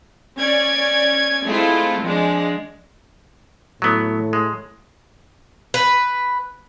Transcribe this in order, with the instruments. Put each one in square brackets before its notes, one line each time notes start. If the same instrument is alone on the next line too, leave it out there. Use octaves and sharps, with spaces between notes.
[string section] C#4 D5 G#6
G#3 A3 C4 E4 F4
F3 G#3 D4
[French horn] A2 [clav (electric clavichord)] F#3 B3
[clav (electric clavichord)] G#3
[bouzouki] B4